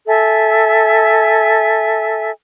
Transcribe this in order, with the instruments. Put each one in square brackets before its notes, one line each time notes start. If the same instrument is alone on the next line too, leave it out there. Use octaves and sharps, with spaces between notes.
[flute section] A4 E5 G#5